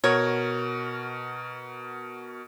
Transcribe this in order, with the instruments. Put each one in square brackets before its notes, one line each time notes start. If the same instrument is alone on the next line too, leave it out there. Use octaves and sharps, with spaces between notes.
[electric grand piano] B2 F#4 A#4 [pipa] C#5